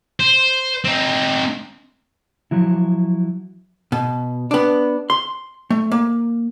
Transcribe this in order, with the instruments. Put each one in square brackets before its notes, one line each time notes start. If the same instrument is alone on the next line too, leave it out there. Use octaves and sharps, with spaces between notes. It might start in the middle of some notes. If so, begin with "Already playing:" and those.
[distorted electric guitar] C5
C4 D#4
[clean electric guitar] F3 F#3 E4
[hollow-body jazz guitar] B2
B3 D4
C6
A3
A#3